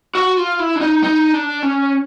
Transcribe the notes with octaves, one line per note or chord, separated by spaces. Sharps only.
F#4
F4
E4
D4
D#4
D#4
D4
C#4